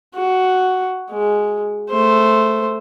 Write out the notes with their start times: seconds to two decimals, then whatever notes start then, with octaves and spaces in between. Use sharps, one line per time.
0.15 F#4
1.11 G#3
1.89 A3 C5